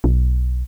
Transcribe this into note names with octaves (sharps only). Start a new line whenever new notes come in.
B1